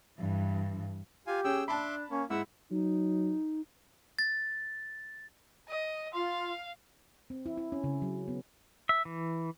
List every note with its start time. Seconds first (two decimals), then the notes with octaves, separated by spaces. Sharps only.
0.19 G2 E3
1.27 F4 G4 F5 G#5
1.44 C#4 G#4 G5 E6
1.68 D4 E5 A5 B5 C6 D6
2.11 A#3 C#4
2.30 G#2 E4 E5 F#5 E6
2.71 F#3 D#4
4.19 A6
5.68 D#5
6.14 F4 F5 C6
7.30 C4
7.46 E4
7.58 E4
7.72 C#4
7.84 C#3
8.02 F#3
8.28 B3
8.89 E5
9.05 E3